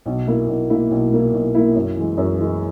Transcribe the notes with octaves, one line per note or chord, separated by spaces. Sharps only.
B1
A#2 A#3 E4
B1
A#2 A#3 E4
B1
A#2 A#3 E4
B1
A#2 A#3 E4
F#2
E3 G#3
F#2
E3 G#3